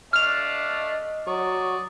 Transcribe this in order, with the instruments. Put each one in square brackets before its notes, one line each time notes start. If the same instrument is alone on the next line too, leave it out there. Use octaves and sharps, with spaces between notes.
[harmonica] A3 D4 F5 [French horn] D#5 [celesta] F6 F7
[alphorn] F#3 [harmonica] D5 C#6 D#6